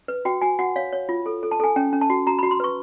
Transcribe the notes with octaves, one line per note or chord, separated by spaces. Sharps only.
B4
F#4 G5
F#4 G#5
F#4 F#5
C#5 F5
C#5
F4
A4
A4
A5
A4 G#5
C#4 G5
C#4
A5
F#4
F#4 A#5
B5
F#4
C6
B4 C#6